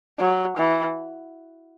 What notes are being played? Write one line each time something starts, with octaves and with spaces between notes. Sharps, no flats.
F#3
E3